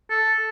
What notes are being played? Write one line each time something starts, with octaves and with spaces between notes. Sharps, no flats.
A4